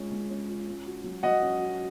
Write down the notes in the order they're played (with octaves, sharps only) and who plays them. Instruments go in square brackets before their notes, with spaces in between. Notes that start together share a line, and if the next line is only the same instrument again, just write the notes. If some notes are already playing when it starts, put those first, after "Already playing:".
Already playing: [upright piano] G#3 C#4 F4
G#3
C#4
F4
C#4
F#4
F#3
[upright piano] F#3 [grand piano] D#5 F#5
[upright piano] C#4
F#4